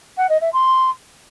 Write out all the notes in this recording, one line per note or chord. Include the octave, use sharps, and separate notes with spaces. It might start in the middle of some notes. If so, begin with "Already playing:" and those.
F#5
D#5
E5
C6